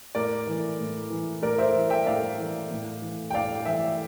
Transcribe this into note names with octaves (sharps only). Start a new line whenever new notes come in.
A2 A#4 D5
E3
A2
E3
A2 A#4 D5
C5 E5
E3
E5 G5
A2 D5 F5
E3
A2
E3
G5
A2 D5 F5
E3 E5 G5